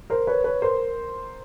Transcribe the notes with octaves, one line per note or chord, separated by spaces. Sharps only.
A#4 C5
B4 C#5
B4 C#5
A#4 C5